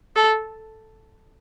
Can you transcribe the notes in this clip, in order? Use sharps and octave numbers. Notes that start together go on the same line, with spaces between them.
A4